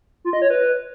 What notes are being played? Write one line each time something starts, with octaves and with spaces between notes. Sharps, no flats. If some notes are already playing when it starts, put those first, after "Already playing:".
F4
D#5
C#5
B4